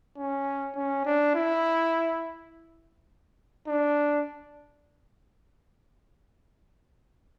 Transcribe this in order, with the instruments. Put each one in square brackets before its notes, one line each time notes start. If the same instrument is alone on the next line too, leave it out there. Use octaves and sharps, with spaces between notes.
[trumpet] C#4
C#4
D4
E4
D4